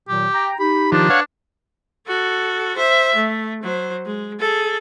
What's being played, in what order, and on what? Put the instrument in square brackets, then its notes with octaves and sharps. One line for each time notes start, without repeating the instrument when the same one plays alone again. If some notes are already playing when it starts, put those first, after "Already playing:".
[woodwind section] A#2 D#3 F#3 [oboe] G4
[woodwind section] G5 A#5
[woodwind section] D#4 G4 [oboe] B5
[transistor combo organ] D#3 F3 [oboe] D4
[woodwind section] B4 [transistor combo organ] C#5 F5 F#5
[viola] F#4 A4
C5 E5
A3
F#3 C5
G#3
G#4 A4